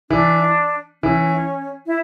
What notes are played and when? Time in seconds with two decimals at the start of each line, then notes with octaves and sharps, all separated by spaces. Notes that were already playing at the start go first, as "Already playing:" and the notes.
0.10 E3 D4
1.03 E3 C#4
1.86 E4